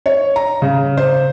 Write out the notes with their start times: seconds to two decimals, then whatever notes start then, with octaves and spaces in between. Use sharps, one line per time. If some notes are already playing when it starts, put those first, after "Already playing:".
0.06 C#5
0.36 A#5
0.62 C#3
0.97 C5